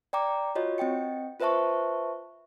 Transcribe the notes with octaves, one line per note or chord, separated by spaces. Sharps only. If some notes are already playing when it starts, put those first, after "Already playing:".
D5 G5 A#5 D6
F4 F#4 C#5 D#5
C4 D#5 G5 C#7
F4 B4 C5 E5 A5 C#6